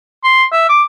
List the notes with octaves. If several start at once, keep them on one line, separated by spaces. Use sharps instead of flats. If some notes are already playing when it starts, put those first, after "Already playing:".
C6
E5
D6